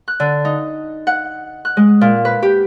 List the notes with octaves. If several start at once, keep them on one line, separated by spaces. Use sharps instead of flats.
F#6
D3
D#4
F#5
F#6
G#3
A#2
B4
G4